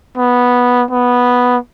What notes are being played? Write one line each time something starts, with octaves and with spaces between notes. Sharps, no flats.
B3
B3